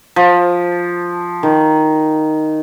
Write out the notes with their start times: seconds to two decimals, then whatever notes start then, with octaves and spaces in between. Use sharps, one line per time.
0.16 F3
1.43 D#3